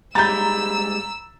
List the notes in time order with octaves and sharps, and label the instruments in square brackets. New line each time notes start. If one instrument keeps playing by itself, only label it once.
[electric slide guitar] G#2 G3 G#3 [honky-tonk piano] A#5 B5 [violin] E6 [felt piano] G6 A6